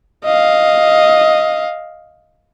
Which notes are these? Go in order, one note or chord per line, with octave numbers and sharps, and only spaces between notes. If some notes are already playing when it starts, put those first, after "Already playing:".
D#5 F5